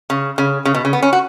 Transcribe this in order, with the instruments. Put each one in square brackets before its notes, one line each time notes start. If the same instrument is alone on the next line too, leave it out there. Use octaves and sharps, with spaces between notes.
[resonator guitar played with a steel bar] C#3
C#3
C#3
B2
C#3
B3
C#4
F#4